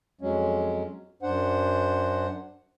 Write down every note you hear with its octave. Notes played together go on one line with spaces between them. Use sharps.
F2 F#3 G#3 C#4
F#2 D4 C5 F#5